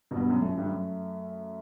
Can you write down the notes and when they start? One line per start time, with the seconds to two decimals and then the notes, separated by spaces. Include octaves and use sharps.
0.11 G2 B2
0.17 B3
0.30 F#2
0.42 A3
0.49 F#2
0.58 G2
0.66 F#2